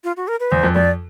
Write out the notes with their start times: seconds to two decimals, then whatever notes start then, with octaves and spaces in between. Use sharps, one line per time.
0.04 F4
0.17 F#4
0.28 A#4
0.40 B4
0.51 E2 C5
0.63 F2
0.74 F2 D5